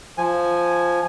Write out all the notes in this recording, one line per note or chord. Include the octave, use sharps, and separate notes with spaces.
F3 G#5